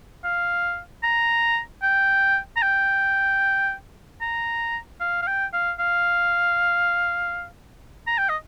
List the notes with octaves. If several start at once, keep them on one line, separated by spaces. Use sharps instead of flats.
F5
A#5
G5
A#5
G5
A#5
F5
F5
G5
F5
F5
A#5
G5
D#5